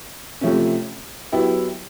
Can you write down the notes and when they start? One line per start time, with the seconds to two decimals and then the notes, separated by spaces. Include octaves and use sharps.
0.41 C3 F3 A3 C#4
1.32 F#3 B3 E4 G4